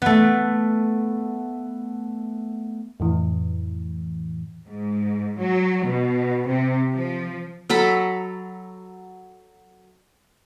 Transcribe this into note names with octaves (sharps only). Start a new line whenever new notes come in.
A3 B3
F2 A2 E3
G#2
F#3
B2
C3
F3
F#3 A4 A#5 B5